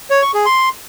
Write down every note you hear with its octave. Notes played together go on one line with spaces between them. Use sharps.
C#5
C#6
G#4
C6